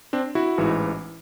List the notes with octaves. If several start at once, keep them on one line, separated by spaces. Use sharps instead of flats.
C4 D4
E4 F#4
A1 G#2 E3